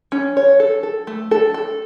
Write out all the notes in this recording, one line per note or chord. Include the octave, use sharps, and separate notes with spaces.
C#4
C#5
A4
A4
A3
A4
A4